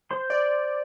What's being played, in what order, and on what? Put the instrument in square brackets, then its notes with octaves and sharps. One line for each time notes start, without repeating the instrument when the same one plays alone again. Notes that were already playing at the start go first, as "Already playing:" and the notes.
[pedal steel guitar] C5 C6
[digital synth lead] D5